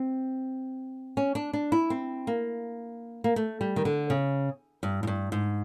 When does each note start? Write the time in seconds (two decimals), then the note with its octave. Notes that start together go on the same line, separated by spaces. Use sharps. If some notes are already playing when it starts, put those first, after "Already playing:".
Already playing: C4
1.17 C#4
1.35 D4
1.53 D4
1.72 E4
1.90 C4
2.27 A#3
3.24 A#3
3.36 A3
3.61 G3
3.76 D#3
3.85 D3
4.10 C#3
4.83 G2
5.03 G#2
5.07 G2
5.32 G#2